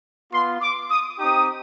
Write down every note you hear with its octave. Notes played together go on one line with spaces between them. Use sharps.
B3 F4 C6
D6
D#6
C4 D#4 G4 D#6